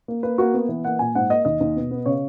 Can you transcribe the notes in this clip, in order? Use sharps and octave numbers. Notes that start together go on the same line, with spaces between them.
A#3
A#3 B4
A#3 F#4
B3
E3
A#3 F#5
A#2 G#5
G#2 F#5
A#3 D#5
D#2 D#5
D#2
B2
B3
C#3 C#5